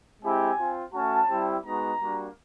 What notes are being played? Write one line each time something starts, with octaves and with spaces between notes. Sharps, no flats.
G#3 C4 E4 G4 G#5
C4 F4
A3 C#4 F#4 A5
G3 C4 E4 G4
G#3 B3 D#4 F#4 A#5
G3 A#3 D4 F#4